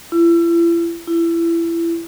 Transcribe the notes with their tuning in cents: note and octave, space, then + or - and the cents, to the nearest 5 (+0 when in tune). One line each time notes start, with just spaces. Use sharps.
E4 +40
E4 +25